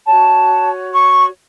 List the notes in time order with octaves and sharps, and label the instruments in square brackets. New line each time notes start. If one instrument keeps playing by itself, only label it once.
[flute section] F#4 C#5 A5
C#6